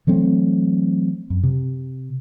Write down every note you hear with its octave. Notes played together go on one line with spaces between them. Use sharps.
E3 F#3 A3 C4
F#2
C3